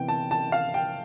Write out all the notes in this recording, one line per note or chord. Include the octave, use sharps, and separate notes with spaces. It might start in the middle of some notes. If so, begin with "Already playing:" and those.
Already playing: C3 E3 B3 G5
A5
A5
F5
G5